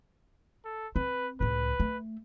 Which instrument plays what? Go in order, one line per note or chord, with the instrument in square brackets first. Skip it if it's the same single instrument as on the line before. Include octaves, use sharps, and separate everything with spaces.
[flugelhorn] A4
[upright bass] C4 [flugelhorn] B4
[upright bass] C#2 A2 [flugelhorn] B4
[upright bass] A3